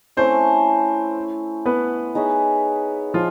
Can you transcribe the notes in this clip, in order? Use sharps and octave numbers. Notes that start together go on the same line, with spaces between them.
A3 C4 C#4 E4 C5
B3 B4
D#4 G#4 C#5 E5
F3 F4